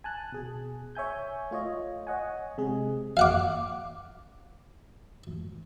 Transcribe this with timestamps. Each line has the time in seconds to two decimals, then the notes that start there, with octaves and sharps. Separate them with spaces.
0.04 G#5 A5 F#6
0.32 B2 G#4
0.95 C#5 E5 G#5 G6
1.51 A3 F4 C#5 D#5
2.07 C#5 D#5 F#5 G#5
2.58 C3 G#3 G#4
3.17 F5 F#5 D6